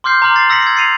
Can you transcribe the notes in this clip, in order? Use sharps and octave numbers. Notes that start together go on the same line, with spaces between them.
C6 D6 F6 G6 C7
A#5 C6 D6 F6 F#7
A6 C7
E6 A#6 B6 C#7 F#7
G#6 C#7
A6 C7 C#7 D#7 F7